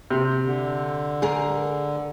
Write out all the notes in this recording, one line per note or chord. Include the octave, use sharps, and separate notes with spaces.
C3
D3
G#4 A#4